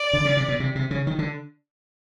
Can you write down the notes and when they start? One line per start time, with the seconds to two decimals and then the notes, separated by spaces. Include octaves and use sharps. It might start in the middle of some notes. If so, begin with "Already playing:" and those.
Already playing: D5
0.13 D3
0.25 C#3
0.37 C3
0.48 B2
0.60 C3
0.75 C3
0.91 C#3
1.07 D#3
1.19 D3